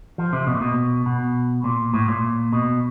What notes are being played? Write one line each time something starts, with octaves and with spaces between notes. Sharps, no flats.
F3
C3
B2
A#2
B2
B2
A#2
A2
A#2
B2